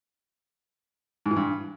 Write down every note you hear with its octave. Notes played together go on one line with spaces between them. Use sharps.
G#2
E3
G2